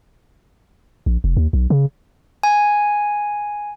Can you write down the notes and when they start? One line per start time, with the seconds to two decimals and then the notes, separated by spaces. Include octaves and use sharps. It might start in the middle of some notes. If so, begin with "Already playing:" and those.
1.06 A#1
1.24 F1
1.37 D#2
1.53 B1
1.70 C#3
2.43 G#5